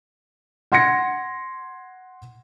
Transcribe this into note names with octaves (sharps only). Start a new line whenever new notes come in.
F#5 C6 G#6 A#6 C#7